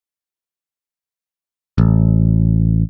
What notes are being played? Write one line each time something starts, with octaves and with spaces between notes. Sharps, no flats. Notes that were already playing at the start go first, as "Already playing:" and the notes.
A1